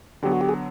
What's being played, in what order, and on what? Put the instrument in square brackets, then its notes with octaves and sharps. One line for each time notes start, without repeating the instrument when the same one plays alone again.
[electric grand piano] D3 F#3 B3 [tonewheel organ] G4
[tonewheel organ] F#4
G4
G#4